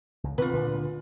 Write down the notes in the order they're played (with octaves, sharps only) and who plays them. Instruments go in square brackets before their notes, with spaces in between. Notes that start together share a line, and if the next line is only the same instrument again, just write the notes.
[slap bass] C#2
[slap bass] B2 D#3 C4 [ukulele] F4 B4
[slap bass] D2 A#2 D3